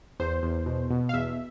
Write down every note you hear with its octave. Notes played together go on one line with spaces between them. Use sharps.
E2 C5
E2
B2
B2
F5
E2 E5